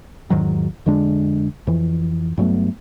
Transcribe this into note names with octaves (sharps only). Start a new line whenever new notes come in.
E2 G#2 D#3 F#3
F2 D3 G#3 D4
F2 E3
G2 F#3 A3 B3